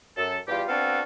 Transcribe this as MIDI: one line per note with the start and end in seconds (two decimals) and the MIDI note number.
0.17 0.37 42
0.17 0.37 69
0.48 0.63 40
0.48 0.63 55
0.48 0.63 65
0.48 0.63 67
0.68 1.01 59
0.68 1.01 60
0.68 1.01 62
0.68 1.01 66
0.68 1.01 69
0.68 1.01 77